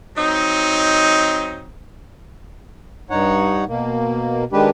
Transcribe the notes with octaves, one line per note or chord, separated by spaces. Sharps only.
F#3 C4 D#4
G2 D#4 C#5 F#5
B2 A#3
D#3 G#3 D4 G4 B4